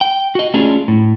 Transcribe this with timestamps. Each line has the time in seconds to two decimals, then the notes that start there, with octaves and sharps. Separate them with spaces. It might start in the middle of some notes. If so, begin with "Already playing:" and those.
0.01 G5
0.35 F#4 D#5
0.54 A3 C#4 D4 F4 G#4
0.88 A2